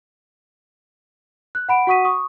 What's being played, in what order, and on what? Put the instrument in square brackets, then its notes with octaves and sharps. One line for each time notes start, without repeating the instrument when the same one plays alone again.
[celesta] F#6
F#5 B5 D7
F#4 F#5 C#6 D#6 B6 D#7
C#6 D#6